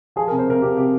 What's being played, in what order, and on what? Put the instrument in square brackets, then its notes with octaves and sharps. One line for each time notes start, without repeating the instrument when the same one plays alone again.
[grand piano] F3 G#4
A#4
C3
C5
C3 A#4
C3 G4
C3 G4